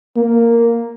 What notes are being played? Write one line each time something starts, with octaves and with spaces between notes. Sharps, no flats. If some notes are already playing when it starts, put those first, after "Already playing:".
A#3